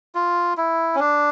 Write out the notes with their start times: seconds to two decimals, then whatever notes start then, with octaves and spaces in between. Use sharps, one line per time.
0.15 F4
0.57 E4
0.95 C#4
1.00 D4